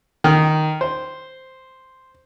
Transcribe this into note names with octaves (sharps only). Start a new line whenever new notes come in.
D#3
C5